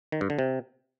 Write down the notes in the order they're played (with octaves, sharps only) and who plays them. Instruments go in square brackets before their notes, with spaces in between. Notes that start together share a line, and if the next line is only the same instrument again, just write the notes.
[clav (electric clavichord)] D#3
G2
D3
C3